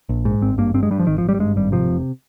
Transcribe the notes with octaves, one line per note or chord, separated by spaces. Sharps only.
A#1
G#2
G#1 C4
G2 A#3
G2 C4
G#3
G2 G3
F3
G#1 D#3
F3
G#1 G3
G3
G2 G#3
G#1 G3
C3 F3
F1